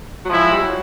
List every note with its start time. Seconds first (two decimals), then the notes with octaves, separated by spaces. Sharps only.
0.25 F#3
0.29 F3 G#3 C4 E4
0.52 G3
0.61 F#3